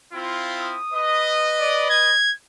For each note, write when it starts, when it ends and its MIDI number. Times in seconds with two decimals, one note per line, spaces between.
0.12 0.75 60
0.12 0.75 64
0.12 0.75 65
0.60 1.49 87
0.92 2.12 71
0.92 2.12 75
1.60 1.87 74
1.90 2.34 92